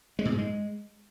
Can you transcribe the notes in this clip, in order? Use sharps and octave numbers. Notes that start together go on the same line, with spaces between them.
G#3
A#2
G#2
G#3